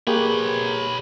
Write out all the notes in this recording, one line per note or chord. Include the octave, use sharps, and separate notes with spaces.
A#3 G4 G#4 B4 C#5